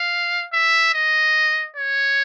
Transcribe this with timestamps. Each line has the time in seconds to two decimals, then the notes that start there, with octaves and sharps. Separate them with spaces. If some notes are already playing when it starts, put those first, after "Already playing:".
Already playing: F5
0.53 E5
0.94 D#5
1.76 C#5